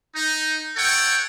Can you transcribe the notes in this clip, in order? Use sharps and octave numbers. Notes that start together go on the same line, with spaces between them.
D#4
A4 C#5 F#5 G5